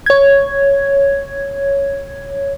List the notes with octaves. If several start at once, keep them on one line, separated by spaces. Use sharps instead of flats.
C#5 G#6